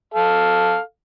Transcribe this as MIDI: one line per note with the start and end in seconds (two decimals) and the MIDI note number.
0.14 0.79 69
0.14 0.79 77